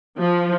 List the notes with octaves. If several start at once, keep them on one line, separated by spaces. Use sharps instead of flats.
F3